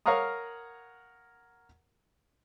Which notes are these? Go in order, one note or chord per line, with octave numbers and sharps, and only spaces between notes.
A#4 C#5 F5 F#5 A#5 D#6